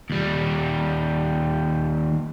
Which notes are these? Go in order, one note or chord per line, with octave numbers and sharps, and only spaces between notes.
D#2 G3